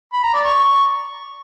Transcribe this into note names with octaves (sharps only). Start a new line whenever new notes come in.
B5
A#5
D5
C#6